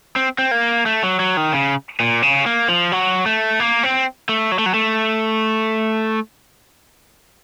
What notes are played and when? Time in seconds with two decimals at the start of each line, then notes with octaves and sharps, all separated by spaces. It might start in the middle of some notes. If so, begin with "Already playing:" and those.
0.16 C4
0.39 C4
0.51 A#3
0.86 A3
1.03 F#3
1.19 F#3
1.37 D#3
1.54 C#3
2.00 A#2
2.22 C#3
2.46 A#3
2.68 F3
2.92 F#3
3.26 A3
3.60 A#3
3.83 C4
4.29 A3
4.52 F#3
4.59 A3
4.66 F#3
4.74 A3